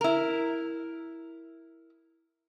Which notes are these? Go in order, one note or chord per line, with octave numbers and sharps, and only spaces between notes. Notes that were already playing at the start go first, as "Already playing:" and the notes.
E4 A#4